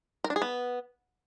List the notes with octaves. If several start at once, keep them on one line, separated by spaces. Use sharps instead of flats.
A#4
D4
G#4
B3